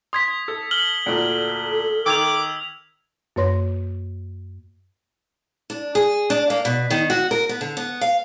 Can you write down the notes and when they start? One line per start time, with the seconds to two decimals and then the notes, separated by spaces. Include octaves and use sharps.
0.13 C6 D#6 G#6 B6
0.48 A4
0.71 F6 F#7 G7
1.06 D2 A#2 A4
2.06 D#3 D6 E6 G#6 F7
3.36 F#2 A#3 B4 C#5 C6 A#6
5.70 D4
5.95 G#4
6.30 D4
6.50 A#3
6.65 B2
6.90 D#3
7.10 F#4
7.31 A#4
7.49 B3
7.61 D3
7.77 B3
8.01 F5